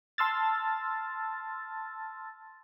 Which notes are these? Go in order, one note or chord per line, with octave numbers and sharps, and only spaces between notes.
A5 C6 E6 F6 A6